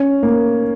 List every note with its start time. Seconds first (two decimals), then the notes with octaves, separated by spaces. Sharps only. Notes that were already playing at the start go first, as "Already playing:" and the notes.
Already playing: C#4
0.23 A#3